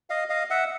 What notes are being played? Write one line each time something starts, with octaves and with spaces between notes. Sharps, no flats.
D#5 F5
D#5 F5
E5 F#5